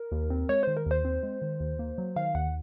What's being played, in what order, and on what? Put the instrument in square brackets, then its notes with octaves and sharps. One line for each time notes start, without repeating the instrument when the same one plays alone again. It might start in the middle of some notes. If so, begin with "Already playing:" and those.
Already playing: [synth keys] A#4
D#2
C4
G#3 C#5
D#3 C5
A#4
D#2 C5
C4
G#3
D#3
D#2
A#3
F#3
D#3 F5
D#2 F#5